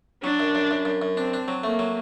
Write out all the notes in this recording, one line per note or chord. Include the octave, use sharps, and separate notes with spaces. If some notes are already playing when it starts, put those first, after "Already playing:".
F#3 D4
F#2
F#2
F#2
F#2
F#2
C4 D4
D4
F#3
A3 A#3
F#3